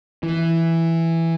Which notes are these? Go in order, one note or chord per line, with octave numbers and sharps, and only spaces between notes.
E3